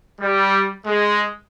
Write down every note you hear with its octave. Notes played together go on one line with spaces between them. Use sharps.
G3
G#3